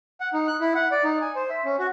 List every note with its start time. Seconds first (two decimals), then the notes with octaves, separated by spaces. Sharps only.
0.20 F#5
0.34 D#4
0.47 F#6
0.61 E4
0.75 F#5
0.92 D5
1.04 D#4
1.21 G#5
1.36 C5
1.50 E5
1.65 C#4
1.79 F#4